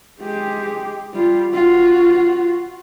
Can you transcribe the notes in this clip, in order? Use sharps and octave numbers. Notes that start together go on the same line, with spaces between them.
G#3 G4
G3 F4
F4 F#4